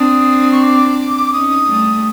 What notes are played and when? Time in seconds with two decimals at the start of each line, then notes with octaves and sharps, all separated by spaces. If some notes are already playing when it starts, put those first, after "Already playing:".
Already playing: C4 D4 D#6
0.52 C#6
0.63 D6
1.32 C#4 D#4 D#6
1.68 G3 A3